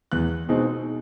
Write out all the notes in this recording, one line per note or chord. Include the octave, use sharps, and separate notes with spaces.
E2 F#6
B2 G#3 C4 D#4